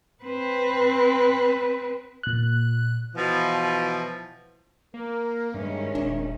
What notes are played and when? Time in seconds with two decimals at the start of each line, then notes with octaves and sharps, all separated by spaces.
0.24 C4 B4
2.23 A#2 F#6
3.15 B2 E3 F3
4.94 A#3 A#4
5.54 G2 D#3 G#3 C#4 E5
5.95 D#1 D4